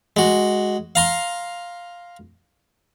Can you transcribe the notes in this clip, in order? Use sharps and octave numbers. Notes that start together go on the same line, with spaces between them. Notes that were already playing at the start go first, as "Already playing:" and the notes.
G#3 F#4
F5 A#5 C6